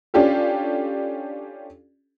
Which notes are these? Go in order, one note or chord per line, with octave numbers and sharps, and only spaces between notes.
C#4 D4 F4 G4 A4